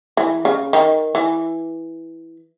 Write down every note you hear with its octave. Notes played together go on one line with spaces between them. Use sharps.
E3
C#3
D#3
E3